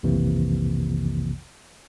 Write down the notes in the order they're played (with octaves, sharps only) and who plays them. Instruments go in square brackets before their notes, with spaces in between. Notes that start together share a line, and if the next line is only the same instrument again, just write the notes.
[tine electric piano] B1 F2 C3 D#3 E3 A#3